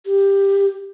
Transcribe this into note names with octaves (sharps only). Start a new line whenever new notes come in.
G4